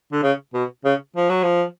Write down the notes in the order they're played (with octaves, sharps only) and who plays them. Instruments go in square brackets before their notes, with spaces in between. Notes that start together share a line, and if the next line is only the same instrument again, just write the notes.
[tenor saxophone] D3
C#3
B2
C#3
F3
F#3
F3